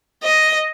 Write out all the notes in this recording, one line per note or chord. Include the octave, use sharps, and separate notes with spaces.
D#5